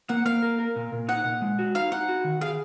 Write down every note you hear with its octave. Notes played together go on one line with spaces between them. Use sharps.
A#3 F#5
A#3 F5
A#4
A#4
A#2
A#2
D#4 F#5
A#2
G#3
F#4
D#4 F5
D#4 F#5
F#4
D#3
G#4 F5